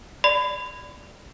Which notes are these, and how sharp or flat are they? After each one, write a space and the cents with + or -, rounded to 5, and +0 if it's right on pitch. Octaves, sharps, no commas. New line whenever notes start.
D5 +0 B5 +25